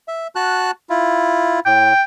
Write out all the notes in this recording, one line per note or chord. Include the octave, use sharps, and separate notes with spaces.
E5
F#4 A5 F#6
E4 F4
A2 G5